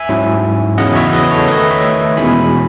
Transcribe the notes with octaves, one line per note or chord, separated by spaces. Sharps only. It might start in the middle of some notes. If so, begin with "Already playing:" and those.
Already playing: E5 G#5
G#2 F#3 C#4 E4
E2 C#3 F#3 C#4 E4 D#5 F#5
C#5 E5
B4 D#5
A4 C#5
D#3 A3 D#4 B4 D#5
C#5 E5
E2 B2 G#3 C#4 E4 G#5 B5